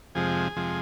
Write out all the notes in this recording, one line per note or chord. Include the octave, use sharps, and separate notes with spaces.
F2 C3 F3 G#3 G#4
F2 C3 F3 G#3